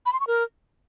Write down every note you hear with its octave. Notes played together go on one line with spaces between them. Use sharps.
B5
C6
C#6
A#4